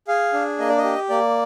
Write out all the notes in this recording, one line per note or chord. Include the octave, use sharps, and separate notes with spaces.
G#4 F5
D4
A#3 D#5
D5
D#5
G4
A#3 D5